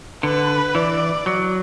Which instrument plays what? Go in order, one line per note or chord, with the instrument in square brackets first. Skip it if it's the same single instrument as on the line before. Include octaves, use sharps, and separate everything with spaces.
[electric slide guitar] D3 [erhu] B4
[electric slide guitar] E3 [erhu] D5
[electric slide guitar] F#3